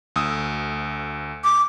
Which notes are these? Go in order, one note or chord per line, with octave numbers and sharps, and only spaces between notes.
D2 D#6 E6
D6